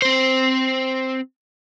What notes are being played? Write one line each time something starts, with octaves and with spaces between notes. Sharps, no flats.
C4 C5